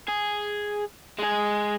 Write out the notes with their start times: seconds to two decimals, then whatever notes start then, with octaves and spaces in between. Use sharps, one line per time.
0.08 G#4
1.19 G#3 G#4